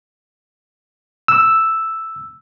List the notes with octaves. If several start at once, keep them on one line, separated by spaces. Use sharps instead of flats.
E6